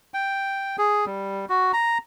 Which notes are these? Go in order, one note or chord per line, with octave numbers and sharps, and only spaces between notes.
G5
G#4
G3
F#4
A#5